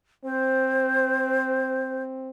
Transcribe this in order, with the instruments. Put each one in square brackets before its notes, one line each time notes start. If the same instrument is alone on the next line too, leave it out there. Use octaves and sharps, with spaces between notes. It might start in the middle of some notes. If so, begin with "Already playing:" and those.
[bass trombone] C4 [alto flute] C5